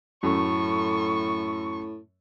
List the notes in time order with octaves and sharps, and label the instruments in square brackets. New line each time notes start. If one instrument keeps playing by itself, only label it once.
[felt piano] F#2 A3 [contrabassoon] A2 [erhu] C#6